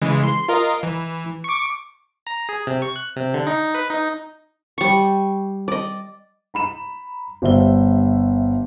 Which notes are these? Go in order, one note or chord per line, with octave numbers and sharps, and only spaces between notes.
C#3 E3 G#3
C6
F4 A#4 D#5
E3
C#6 D6
A#5
G#4
C3
C#6
F#6
C3
D3
D#4
B4
D#4
G3 C#6
D5 D#5
A#5 B5 E7
G1 G3 C5 E5 G7